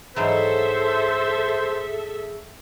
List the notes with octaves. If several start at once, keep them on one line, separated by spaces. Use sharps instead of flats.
G#2 E3 F#3 G#4 A4 C5 E5